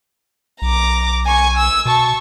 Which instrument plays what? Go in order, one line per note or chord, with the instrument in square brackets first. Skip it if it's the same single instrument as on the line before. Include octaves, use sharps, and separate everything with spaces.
[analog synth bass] B1 [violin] A#5 D6
[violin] G#5 C#6
E6
[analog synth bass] B2 [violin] A5 C#6